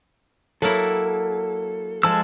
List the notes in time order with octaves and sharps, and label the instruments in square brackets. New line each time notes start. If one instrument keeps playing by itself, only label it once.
[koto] F#3 A#3 E4 [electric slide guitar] A4
[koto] F3 [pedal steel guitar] G#3 A5 E6